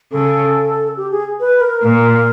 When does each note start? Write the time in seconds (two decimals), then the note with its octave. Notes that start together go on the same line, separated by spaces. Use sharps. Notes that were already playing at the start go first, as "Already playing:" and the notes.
0.12 C#3 A4
0.97 G4
1.11 G#4
1.40 B4
1.61 A#4
1.83 A#2 A#4